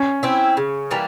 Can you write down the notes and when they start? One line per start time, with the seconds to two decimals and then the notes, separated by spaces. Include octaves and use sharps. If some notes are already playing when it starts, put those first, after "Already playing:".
Already playing: C#4
0.23 C4 E4
0.57 C#3
0.91 E3 G3 A#3